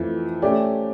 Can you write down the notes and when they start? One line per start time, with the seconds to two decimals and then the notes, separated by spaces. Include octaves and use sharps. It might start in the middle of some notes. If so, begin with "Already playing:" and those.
Already playing: F2 E3 A3
0.42 A3 C#4 G4 D5